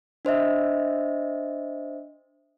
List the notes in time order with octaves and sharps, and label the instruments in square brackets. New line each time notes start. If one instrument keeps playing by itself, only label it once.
[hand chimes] D4 C5 D#5 E5